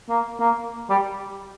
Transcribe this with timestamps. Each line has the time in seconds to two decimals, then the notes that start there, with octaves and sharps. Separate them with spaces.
0.09 A#3
0.40 A#3
0.90 G3